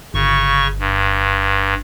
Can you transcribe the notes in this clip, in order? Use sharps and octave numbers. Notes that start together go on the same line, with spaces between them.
G1 C#3 C#6
G2